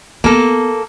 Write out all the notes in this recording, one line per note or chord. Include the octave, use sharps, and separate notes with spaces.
A#3 B3 A4